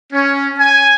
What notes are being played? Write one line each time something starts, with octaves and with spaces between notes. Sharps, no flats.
C#4
G#5